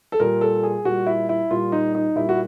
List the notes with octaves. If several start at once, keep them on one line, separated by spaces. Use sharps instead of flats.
A4
A#2 G3 A#4
A4
G#4
A#2 G3 F#4
E4
E4
A#2 G3 F4
D#4
D#4
A#2 G3 E4
F#4